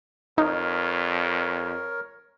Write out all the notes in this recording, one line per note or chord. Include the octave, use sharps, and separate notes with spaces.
F2 D#4 A#4 C#5